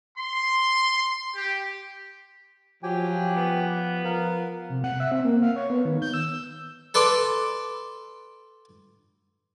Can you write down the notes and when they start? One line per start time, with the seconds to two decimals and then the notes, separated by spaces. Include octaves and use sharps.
0.17 C6
1.35 G4
2.83 F3 F#3 G4 G5 G#5
3.36 B3
4.05 F3 A#4 F5
4.69 C3
4.84 F#5
5.00 E5
5.12 C4
5.25 A#3
5.43 F5
5.56 C#5
5.70 B3
5.85 D#3
6.02 G6
6.14 E6
6.94 A4 B4 D5 C6 D6